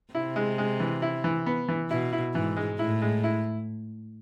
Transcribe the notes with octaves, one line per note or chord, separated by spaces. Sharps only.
C3 E4
G#3
G#3
E3
E4
E3
B3
E3
B2 E4
E4
G#2 E3
G#3
A2 E4
G#3
E4